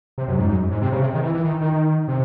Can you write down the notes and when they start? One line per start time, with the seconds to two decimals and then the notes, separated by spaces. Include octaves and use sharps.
0.18 C3
0.28 F#2
0.38 G#2
0.49 F#2
0.71 G#2
0.82 C3
0.92 C#3
1.02 C3
1.14 D#3
1.23 E3
1.35 E3
1.44 D#3
1.61 D#3
2.08 C3